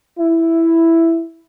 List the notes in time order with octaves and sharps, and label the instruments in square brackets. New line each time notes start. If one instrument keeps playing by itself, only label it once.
[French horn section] E4